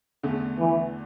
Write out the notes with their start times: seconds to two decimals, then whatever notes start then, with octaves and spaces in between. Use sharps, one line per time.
0.23 E2 D3 A3
0.59 E3